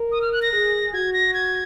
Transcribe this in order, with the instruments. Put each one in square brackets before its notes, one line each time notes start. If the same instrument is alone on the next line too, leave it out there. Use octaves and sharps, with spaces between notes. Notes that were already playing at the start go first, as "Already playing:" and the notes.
Already playing: [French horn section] A#4
[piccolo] D#6
F6
F#6
A#6
[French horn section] G#4
[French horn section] F#4 [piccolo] G#6
[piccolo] A#6
G#6